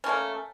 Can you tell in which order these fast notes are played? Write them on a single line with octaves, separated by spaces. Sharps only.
C#4 A3 A#3